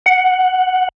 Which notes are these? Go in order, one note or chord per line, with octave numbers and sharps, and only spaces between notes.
F#5